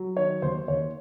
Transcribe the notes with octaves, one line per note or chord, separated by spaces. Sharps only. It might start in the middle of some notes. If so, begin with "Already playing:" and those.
Already playing: F#3
D#3 C#5
D#2 C5
D#2 C#5